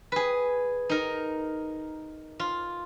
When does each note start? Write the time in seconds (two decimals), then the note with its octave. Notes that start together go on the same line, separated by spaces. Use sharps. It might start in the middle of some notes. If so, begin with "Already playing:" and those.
0.12 G#4 B4
0.89 D#4 A#4
2.39 F4